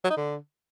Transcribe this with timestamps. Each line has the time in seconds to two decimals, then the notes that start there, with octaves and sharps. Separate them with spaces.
0.04 F#3
0.11 D#4
0.17 D3